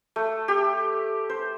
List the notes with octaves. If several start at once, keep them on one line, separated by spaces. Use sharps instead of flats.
A3
G4
C5